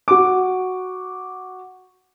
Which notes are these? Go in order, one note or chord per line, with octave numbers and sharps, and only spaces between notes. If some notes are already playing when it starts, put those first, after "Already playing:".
F#4 D6